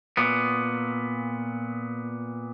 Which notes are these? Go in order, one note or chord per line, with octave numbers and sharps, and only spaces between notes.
A#2 B3